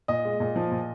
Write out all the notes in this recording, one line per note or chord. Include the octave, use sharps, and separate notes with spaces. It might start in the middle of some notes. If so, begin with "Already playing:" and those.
A#2 D#5
G#3
A#2
F3
A#2